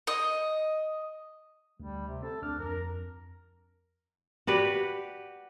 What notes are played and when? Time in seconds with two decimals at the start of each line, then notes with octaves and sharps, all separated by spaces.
0.07 D#5
1.80 D2 G3
2.07 C3
2.23 C4 A4
2.42 D2 D4 F6
2.59 F2 A#4
4.47 F#4 G4 B4 D5